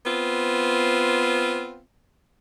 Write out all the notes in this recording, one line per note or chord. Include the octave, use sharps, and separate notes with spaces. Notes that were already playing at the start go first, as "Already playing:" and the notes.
B3 C4 F4